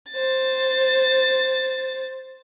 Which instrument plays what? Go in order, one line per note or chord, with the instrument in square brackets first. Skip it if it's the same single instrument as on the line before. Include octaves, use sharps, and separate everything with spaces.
[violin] C5 A6